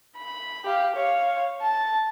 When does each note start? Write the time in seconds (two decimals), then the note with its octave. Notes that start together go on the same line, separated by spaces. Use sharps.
0.17 B5
0.65 G4 F5
0.96 C#5 F5
1.62 A5